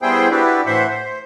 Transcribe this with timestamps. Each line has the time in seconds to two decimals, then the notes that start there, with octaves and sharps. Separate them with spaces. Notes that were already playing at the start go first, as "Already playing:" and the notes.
0.02 G3 B3 E4 G#4 C5 G5
0.31 D4 E4 F#4 G4 B4
0.66 A2 E3 C5 E5 F#5
0.88 C5